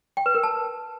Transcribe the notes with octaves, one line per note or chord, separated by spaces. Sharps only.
G5
B4
A#4
A5